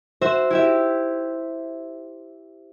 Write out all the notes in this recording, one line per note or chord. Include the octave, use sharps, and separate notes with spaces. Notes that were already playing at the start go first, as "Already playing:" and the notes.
F#4 C5 E5
E4 G4 E5